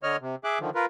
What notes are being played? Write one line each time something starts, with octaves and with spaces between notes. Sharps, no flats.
D3 C#5 D#5 F6
C3
G#4 E5 D6 F#6
D3 D#3 F3
F4 A#4 B4